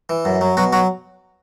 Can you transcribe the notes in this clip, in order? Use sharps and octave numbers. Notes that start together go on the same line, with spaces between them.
E3
F#2
F#3
B2 F#3 F#4
F#3 F#4